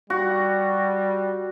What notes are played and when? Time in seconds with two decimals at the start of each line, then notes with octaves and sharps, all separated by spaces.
0.10 G3 F#4